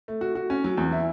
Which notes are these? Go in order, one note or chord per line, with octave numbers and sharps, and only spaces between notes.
A3
F#4
F#4
C#4
F#3
E2
E4